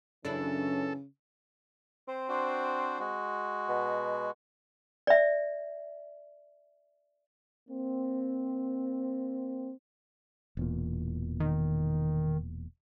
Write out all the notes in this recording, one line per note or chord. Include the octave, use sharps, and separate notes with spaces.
F#2 C#3 E3 C#4 D4 E4 A4
C4 C5
D4 F#4 C5
G#3 F#4
B2
D5 E5
A#3 C4
E1 E2 A#2
D#3